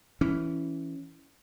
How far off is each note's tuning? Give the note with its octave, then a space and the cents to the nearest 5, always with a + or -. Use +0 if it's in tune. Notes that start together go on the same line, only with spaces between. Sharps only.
E3 +0 C#4 +0